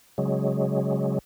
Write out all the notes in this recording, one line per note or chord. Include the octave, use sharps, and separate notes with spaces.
C#3 F#3 G#3